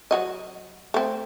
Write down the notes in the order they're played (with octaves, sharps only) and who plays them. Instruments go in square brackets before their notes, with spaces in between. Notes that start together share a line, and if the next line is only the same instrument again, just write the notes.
[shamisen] F#3 F#4 D#5
A3 C4